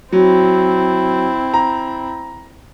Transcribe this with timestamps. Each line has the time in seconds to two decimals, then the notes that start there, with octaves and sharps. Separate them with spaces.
0.12 F#3 C4 E4
1.54 A#5